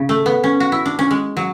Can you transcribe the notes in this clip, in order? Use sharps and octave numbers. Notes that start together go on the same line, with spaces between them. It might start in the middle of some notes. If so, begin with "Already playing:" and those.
Already playing: C#3
A3
B3
C#4
F#4
E4
D4
C#4
G#3
F#3